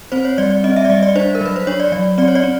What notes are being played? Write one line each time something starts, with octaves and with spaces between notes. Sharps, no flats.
C4 C5
C#5
G3 D5
D5
C4 D#5
E5
D5
G3 D#5
D5
D4 C5
A#4
F#3 B4
C5
D4 C#5
D5
F#3 D5
C4 D5
C#5
D5
C4